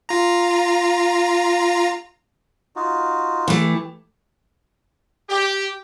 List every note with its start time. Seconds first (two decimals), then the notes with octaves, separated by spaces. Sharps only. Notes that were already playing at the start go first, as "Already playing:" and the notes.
0.09 F4 A#5
2.76 D#4 F4 F#4
3.48 E3 A3 G4
5.30 G4